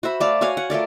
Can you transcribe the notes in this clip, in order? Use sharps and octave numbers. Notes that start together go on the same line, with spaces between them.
F#4 C5 E5 B5
A3 D5 F5
F#4 C#5 F5 G#5
F#5
A3 F4 A#4 D5